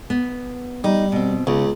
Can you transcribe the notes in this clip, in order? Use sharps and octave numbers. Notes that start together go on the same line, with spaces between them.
B3
G3 D#4
B2 C4
C#2 C#3